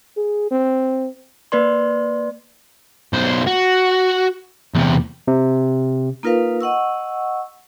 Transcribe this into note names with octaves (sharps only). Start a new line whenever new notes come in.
G#4
C4
A#3 B4 D5 C6
B1 C5
F#4
E2 C3
C3
A#3 D#4 F4 A#4 B4 F5
D#5 F#5 C#6 E6